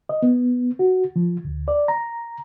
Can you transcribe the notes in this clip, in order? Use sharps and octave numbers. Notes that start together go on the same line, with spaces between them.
D#5
B3
F#4
F3
D2
D5
A#5